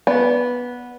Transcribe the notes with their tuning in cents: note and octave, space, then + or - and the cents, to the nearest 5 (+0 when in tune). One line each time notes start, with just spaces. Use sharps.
B3 -10 D5 -15 B5 +0